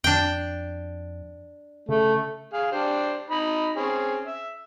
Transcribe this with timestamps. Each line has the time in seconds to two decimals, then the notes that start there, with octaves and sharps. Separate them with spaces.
0.04 F2 D4 G5
1.89 C#3 A3
2.53 G#4 F5
2.72 D4 G4 C5
3.30 D#4 B5
3.76 C4 C#4 G#4
4.27 E5